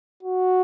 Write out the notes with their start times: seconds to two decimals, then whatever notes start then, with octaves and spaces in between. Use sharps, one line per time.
0.23 F#4